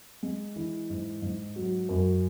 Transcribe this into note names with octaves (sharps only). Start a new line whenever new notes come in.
G#3
E3
G#2
G#2
F#3
F#2